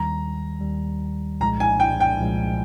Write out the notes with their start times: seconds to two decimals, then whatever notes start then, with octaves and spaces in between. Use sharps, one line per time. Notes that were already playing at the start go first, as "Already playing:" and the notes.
Already playing: D#2 D#3 G3 A#5
0.61 D#2 D#3 G3
1.41 C2 A#2 F3 G#3 A#5
1.60 G#5
1.80 G5
2.00 G5
2.20 C2 A#2 F3 G#3